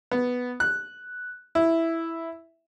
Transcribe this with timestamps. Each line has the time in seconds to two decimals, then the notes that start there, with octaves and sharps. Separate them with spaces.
0.11 B3
0.60 F#6
1.55 E4